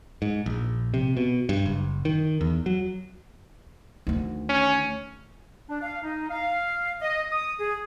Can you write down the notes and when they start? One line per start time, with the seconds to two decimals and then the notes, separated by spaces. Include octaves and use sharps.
0.22 G#2
0.46 A#1
0.94 C3
1.17 B2
1.49 G2
1.66 F#1
2.05 D#3
2.41 E2
2.66 F#3
4.07 D2 D#3
4.49 C#4
5.69 D4
5.82 F5
6.03 D#4
6.30 F5
7.01 D#5
7.32 D#6
7.59 G#4